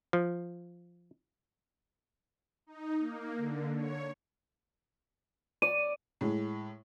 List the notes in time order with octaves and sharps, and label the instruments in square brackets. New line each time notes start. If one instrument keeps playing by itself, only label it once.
[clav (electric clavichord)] F3
[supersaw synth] D#4
A#3
D3
C#5
[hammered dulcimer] D5 [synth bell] D#7
[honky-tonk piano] A2 G#3